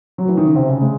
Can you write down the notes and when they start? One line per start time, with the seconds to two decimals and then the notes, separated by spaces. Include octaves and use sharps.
0.18 F#3
0.28 E3
0.37 D#3
0.47 C#3
0.56 C3
0.69 C#3
0.81 G#3